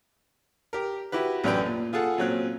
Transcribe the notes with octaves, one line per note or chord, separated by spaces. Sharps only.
G4 A#4
E4 F#4 G4 B4
A1 F#2 C#4 D4 B4 G5
A#2
F4 G#4 A4 F#5
A#2 F#3 C4 C#4 F#6